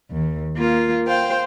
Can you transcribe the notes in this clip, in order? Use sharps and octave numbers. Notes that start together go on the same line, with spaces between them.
D#2
A#3 F4
C5 F5 G5